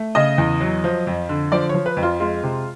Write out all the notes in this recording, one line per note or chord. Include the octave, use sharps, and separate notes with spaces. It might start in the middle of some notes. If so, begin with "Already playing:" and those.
Already playing: A3
C#3 D#5
E2
F#3
F3
F2
D3
F3 D5
F3 C#5
B4
F2
F4
G#3 F4
C3